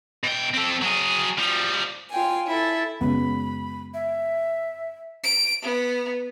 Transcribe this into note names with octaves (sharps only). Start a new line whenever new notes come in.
B2 G5
C4 A4
F#3 G#4
F3 G3
F4 G5 G#5
E4 A4
F#2 C#3 G#3 B3 C#4 B5
E5
D7
B3